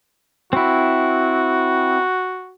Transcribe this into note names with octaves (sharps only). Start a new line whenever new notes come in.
C4 E4 F#4